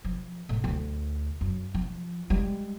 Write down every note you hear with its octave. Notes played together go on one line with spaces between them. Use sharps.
F3
A2
D2
F#2
F3
G3 G#3